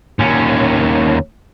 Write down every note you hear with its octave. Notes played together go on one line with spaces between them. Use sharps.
D#2 C#4